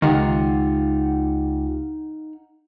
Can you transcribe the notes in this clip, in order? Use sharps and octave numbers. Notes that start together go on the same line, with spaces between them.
C#2 D#3 D#4 F4 G4 F5 F#5